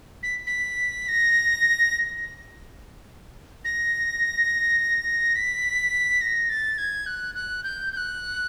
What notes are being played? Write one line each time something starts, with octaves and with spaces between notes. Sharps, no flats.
B6
B6
A#6
A#6
B6
A#6
A6
G#6
F#6
F#6
G6
G6
F#6